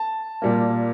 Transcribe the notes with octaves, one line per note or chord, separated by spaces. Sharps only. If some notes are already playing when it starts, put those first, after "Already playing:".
Already playing: A5
A#2 G3 A#3